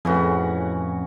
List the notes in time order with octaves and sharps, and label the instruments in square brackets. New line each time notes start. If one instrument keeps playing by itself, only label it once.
[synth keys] F2 A2 [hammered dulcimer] C#3 E3 F#4